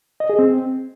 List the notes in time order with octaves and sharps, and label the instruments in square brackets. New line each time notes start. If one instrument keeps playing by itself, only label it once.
[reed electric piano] D#5
G#4
C4